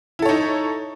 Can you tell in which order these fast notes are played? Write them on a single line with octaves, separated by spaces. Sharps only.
E4 A4 C#5 D#4